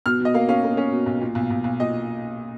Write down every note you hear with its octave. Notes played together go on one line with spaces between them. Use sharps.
B2 F6
B2 D#5
A#3 F5
C#4 F5
A#3
C#4
B2
B1
A#2
B1
B1
B1
A#2 D#5